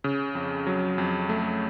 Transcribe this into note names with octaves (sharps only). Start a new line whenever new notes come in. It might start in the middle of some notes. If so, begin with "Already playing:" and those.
C#3
F2
F#3
F2
A3